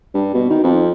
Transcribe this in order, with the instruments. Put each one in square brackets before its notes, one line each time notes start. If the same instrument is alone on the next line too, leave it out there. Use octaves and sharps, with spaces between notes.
[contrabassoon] G2
B2
D#3
F2